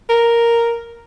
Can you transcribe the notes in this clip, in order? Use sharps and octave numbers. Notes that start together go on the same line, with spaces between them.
A#4